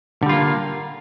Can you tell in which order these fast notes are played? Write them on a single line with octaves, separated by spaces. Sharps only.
D3 G3 F4 A#3